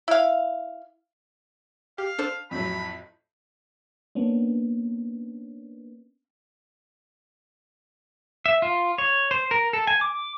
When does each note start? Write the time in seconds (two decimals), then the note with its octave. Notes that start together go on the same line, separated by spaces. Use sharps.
0.08 E4 F5
1.98 G4 F5
2.18 D4 A4 C5
2.51 F2 A2 F#3 B5
4.15 A#3 B3 C#4 D4
8.46 E5
8.62 F4
8.98 C#5
9.31 C5
9.51 A#4
9.73 A4
9.87 G#5
10.01 D6